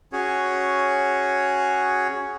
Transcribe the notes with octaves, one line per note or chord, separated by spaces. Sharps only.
C#4 F#4 G#4 C#5